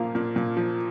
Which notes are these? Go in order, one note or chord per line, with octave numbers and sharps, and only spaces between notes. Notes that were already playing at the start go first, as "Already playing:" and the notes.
Already playing: A#2 F3 A#3 F5
A#2
A#2
F3